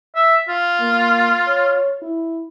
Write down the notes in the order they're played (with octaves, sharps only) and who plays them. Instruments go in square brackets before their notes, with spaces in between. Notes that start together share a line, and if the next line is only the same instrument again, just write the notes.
[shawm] E5
F4
[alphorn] A#3
C#5
E4